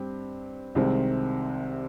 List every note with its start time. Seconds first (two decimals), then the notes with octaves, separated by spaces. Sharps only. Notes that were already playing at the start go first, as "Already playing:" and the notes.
Already playing: G2 C4 G4
0.75 C2 C3 D#3 G#3 C4